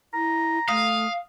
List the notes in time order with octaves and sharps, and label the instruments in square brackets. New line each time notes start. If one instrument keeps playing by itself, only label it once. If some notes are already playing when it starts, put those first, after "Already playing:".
[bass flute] E4 [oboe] A#5
[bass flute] A3 [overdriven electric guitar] F5 [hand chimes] D#6